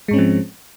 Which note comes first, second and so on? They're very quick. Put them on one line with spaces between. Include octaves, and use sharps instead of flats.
G#3 G#2 C#4 C4 F3